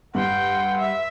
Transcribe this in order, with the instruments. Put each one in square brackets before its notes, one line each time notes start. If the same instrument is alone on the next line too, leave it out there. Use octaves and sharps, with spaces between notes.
[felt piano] G2 [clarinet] F#5 [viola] G5 C6
[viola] E5